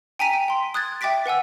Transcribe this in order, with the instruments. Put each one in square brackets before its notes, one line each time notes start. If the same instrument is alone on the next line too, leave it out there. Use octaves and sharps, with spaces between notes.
[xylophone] G5 G#5 A#5 B6 D#7
G5
G5 C6
D#6 F#6 G#6 A6
E5 G5 D6 A6 B6 D7
B4 F#5 G#5 E6